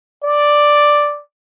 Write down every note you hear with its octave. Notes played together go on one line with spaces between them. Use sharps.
D5